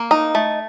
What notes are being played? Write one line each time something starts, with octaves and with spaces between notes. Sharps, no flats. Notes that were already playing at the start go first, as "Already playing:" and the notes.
Already playing: A#3
D#4
A3